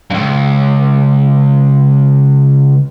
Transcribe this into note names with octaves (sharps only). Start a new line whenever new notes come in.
C#2 G2